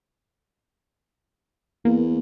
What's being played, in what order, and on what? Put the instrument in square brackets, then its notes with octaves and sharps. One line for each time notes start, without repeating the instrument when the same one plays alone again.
[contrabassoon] E2 [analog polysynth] A#3